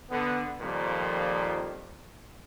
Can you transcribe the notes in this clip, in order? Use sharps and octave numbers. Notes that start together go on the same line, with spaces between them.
D3 B3
F2 A#2 D#3 F3 G3